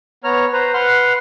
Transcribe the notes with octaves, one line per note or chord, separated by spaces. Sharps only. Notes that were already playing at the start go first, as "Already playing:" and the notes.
B3 C#5 A#5 F6
B4 C5 A#5
B4 F#5 C6 F6